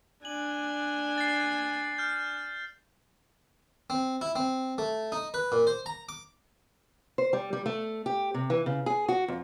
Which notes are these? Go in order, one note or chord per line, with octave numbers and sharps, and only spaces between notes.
D4 G#5 F#7
A6 C7
F6 G6
C4
E4
C4
A3
D#4
B4
A#2
C5
A#5
D6
C5
G3
G3
A3
G4
C3
E3
C#3
G#4
F#4
F2